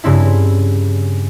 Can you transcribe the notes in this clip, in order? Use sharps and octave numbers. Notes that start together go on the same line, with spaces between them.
G2 C#3 C4 E4